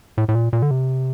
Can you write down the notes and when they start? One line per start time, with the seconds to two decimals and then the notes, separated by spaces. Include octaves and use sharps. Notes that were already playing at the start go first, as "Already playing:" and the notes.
0.18 A2
0.28 A2
0.35 A#2
0.53 A#2
0.62 D3
0.71 C3